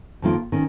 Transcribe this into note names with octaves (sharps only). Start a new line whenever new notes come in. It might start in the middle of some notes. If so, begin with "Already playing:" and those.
F2 D#3 A#3 F4
D#3 C#4